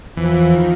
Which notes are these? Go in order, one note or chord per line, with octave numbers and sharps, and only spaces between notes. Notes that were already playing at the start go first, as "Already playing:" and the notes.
E2 E3 F3
D#3